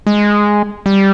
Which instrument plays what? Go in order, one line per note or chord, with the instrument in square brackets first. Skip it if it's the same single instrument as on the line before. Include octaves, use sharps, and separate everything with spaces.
[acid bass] G#3
G3